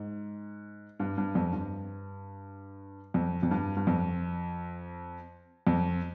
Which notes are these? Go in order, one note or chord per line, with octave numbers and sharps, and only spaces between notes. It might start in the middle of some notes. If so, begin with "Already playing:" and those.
Already playing: G#2
G2
G2
F2
G2
F2
F2
G2
G2
F2
F2